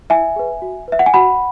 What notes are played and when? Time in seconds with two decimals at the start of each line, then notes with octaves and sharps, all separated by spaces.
0.10 E4 E5 G#5
0.36 G#4 B4
0.62 F#4
0.88 B4 E5
0.99 F#5
1.06 G#5
1.14 F#4 F#5 B5